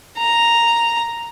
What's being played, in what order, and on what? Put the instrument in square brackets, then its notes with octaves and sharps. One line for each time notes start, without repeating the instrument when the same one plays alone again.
[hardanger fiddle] A#5